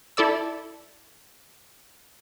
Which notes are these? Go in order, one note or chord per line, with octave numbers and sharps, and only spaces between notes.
E4 A4 D5 E6